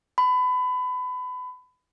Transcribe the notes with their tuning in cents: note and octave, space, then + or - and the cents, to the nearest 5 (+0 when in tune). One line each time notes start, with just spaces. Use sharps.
B5 +25